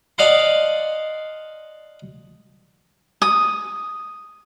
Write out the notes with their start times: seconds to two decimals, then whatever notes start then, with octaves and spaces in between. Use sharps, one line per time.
0.18 D5 D#5 F5 F#5 A5 C6
3.22 D#6